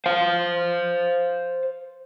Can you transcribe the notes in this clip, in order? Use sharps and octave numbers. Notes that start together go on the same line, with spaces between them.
C5 F5